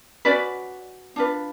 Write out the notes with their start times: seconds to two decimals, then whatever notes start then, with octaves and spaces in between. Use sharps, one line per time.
0.25 C#4 F#4 B4 D5
1.16 D4 F4 B4